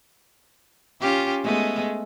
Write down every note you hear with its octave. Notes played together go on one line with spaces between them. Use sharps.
C#4 F4 G4
G#3 A3 B3